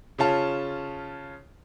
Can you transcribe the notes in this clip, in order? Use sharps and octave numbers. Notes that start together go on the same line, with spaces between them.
C#3 C#4 F4 A5